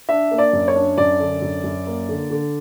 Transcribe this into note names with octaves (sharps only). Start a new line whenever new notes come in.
D4 E5
A#3
D5
F#2
C#5
D4
F#2 D5
D3
F#2
F#2
A#3
D3
D3